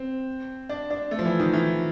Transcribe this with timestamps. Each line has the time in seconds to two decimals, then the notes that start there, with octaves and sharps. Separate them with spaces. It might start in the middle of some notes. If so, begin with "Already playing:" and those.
Already playing: C4
0.69 D4
0.90 D4
1.11 A3
1.19 F3
1.26 E3
1.40 D#3
1.53 E3